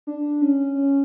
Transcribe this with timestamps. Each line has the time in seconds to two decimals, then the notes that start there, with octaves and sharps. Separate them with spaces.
0.07 D4
0.41 C#4
0.75 C#4